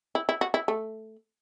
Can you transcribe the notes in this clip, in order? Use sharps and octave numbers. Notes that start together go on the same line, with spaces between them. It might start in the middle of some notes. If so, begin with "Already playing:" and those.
E4
E4
F#4
E4
A3